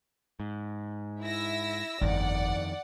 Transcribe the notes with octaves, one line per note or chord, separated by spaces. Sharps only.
G#2
E4 E6 A#6
G1 F2 D#3 D5 F#5